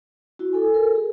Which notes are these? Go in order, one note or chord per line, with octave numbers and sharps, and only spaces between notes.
E4 F#4
A4 G#5
A4 A#4
G#4